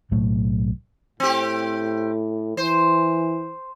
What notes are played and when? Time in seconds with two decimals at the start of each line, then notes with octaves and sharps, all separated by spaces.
0.11 B1 A2 F#3 A3
1.20 A2 C4 G4
2.57 E3 C5